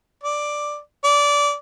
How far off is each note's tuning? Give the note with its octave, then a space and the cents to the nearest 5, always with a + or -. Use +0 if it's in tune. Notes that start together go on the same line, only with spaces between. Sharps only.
D5 +5
D5 -20